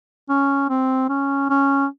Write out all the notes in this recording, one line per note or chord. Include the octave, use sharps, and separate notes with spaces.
C#4
C4
C#4
C#4